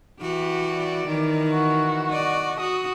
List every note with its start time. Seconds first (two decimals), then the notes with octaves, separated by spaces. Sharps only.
0.21 E3 F#4 G4
0.73 D5
1.08 D#3 E3
1.51 F#4
2.12 D5 D#5
2.60 F#4 D#6